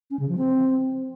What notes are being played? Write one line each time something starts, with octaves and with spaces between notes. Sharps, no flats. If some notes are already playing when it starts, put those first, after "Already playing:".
C#4
C#3
F3
C4